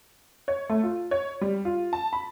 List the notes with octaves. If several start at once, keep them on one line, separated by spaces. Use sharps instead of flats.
C#5
A3
F4
C#5
G3
F4
A5
B5